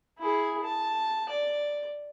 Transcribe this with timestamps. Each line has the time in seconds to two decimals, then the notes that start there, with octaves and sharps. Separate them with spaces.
0.19 E4 G#4
0.64 A5
1.29 D5